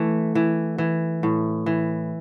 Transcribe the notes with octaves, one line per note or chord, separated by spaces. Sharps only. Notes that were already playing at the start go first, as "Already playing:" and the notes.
Already playing: E3 A3
E3
E3
A2
E3